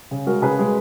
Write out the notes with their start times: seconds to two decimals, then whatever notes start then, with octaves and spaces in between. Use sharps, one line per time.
0.11 C#3
0.26 G#3 F#4 A#4
0.42 C#3 G#4 B4
0.59 G#3